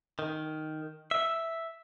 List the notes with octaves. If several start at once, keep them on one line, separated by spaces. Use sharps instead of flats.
D#3
E5